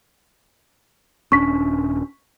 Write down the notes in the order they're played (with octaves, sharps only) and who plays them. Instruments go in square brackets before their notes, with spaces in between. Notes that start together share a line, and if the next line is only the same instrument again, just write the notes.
[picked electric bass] D#1 C#4 D4 [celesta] C#6 B6